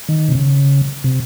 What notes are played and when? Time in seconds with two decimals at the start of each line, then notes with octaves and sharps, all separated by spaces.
0.09 D#3
0.29 C3
0.35 C#3
1.04 C3